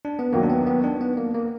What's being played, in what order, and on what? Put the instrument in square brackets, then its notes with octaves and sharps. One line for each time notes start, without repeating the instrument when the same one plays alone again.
[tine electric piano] D4
B3
[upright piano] D#2 D#3 F#3 [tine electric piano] A#3
[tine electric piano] D4
B3
B3
D4
B3
A#3
A#3